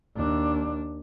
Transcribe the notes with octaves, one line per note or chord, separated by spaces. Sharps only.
D#2 D4